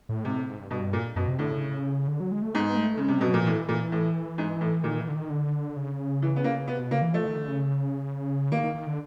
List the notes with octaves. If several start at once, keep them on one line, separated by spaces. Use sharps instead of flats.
A2
G#2 C3
A2
G#2
G2
G2 B2
A#2
F#2 B2
C3
A2 D3
C#3
D3
F#3
G#3
A3
G#2 B3
A3
C#3 G#3
C3 G3
B2 F#3
A#2 F3
A2 E3
A#2
A2
G#2
A2
A#2 D#3
E3
D3
D#3
D3
C#3
E3
B3
A#3
C3 B3
B2
C#3 A#3
E3
F3 A3
D#3
D3
C#3
D#3 A#3
D#3
D#3
D3